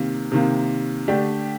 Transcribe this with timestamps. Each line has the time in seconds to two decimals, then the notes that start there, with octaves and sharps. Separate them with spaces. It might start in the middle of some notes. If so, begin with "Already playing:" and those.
Already playing: C3 D#3 A#3
0.32 C3 D#3 A#3
1.08 D3 A3 D4 G4